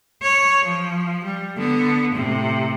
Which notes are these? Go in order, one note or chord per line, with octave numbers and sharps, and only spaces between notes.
C#5
F3
G3
D3 B3
A2 C3